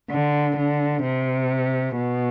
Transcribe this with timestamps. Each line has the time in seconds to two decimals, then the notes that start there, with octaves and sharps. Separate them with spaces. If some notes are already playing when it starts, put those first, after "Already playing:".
0.10 D3
0.57 D3
1.03 C3
1.96 B2